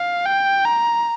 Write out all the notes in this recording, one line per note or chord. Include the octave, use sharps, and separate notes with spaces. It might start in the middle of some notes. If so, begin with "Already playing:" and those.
Already playing: F5
G5
A#5